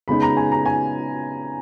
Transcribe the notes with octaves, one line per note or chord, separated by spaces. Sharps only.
C#3 G#3 B3 D#4 B5
A#5
G#5
A#5
G#5